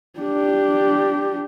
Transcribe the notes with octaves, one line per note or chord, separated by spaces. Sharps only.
D4 G4